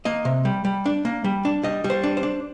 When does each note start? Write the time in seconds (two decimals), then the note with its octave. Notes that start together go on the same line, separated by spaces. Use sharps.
0.05 A#3 D#5
0.25 C3
0.45 G3
0.65 G3
0.86 D4
1.05 A#3
1.24 G3
1.45 D4
1.63 G3 D#5
1.84 G3
1.90 C5
2.03 D4
2.17 C5
2.23 D4